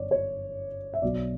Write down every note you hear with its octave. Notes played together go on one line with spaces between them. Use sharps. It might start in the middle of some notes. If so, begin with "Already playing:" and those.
Already playing: G1 F#2 C#5 D5
C#5
E5
B1 B2 F#3 D5